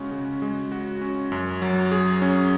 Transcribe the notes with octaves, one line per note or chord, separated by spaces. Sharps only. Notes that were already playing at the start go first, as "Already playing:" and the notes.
Already playing: C#3 G#3 C#4 F#4
C#3
G#3
F#4
C#4
F#2
F#3
G#4
C#4